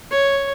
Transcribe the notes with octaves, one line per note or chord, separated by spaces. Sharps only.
C#5